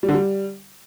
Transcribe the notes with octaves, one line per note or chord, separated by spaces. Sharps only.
G3
D3
G3